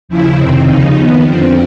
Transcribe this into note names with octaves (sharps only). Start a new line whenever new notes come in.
D#2 C#3 F3 E4
F2 C3 D#3 C4
D#2 C#3 F3 D#4
D#2 D#3 B3
F2 D3 F3 C4